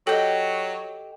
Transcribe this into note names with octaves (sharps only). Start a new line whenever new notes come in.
F#3 G4 A4 D#5 G5